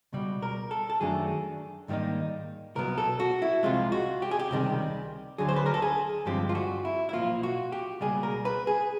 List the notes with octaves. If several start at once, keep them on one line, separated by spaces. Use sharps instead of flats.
C#2 B2 G3
A#4
A4
A4
F#2 D#3 F#3 A3 D4 G#4
G#2 D#3 G3 A#3 D#4
C2 B2 F#3 B3 A#4
A4
F#4
E4
C2 C3 F3 G#3 F4
F#4
G4
G#4
G4
C#2 C3 D#3 G3
D2 D3 F#3 G#4
C5
B4
A#4
A4
G#4
G2 D3 F3 G#3 C4 G4
F4
F#4
E4
E4
B1 A#2 F3 A#3 F4
F#4
G4
C#2 B2 G3 A#3 G#4
A#4
B4
G#4